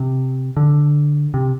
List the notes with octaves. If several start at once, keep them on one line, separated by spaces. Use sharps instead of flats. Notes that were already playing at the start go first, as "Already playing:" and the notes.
Already playing: C3
D3
C3